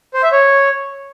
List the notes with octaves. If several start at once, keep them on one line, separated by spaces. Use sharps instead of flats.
C5
E5
C#5